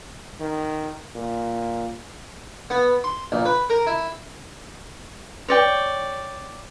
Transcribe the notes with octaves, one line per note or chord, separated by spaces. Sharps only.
D#3
A#2
B3
C6
A#1
B4
A#4
E4
C#5 D5 G5